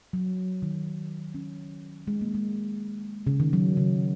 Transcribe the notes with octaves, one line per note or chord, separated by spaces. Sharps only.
F#3
D#3
C#4
G#3
A#3
G#3
C#3
D#3
F#3
C#3